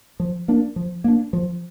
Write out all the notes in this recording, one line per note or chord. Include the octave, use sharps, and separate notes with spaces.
F3
A#3 D4
F3
A#3 D4
F3